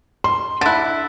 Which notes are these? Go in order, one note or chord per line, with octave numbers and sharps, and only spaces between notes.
C6
D3 E4 F#6 A6